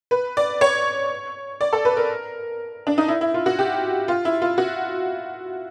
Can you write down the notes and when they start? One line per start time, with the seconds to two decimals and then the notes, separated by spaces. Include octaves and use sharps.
0.11 B4
0.37 D5
0.61 C#5
1.61 D5
1.73 A4
1.85 B4
1.97 A#4
2.87 D4
2.98 D#4
3.08 E4
3.21 E4
3.34 F4
3.46 F#4
3.59 G4
4.08 F4
4.25 E4
4.42 F4
4.58 F#4